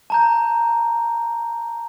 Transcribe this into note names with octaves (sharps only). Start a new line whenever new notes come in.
A5 A#5 G6